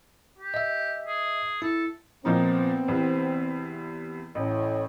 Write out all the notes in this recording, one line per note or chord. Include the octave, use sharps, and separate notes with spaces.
G4
D#5 E5
G#4
E4 A4
A#2 F3 B3 C4 D#4
E2 C3
A1 A2 C#5